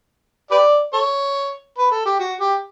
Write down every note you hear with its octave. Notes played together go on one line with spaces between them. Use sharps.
G4 B4 D5
A4 C#5
B4
A4
G4
F#4
G4